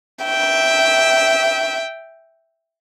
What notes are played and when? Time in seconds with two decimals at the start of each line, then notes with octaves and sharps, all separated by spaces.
0.24 E5 G5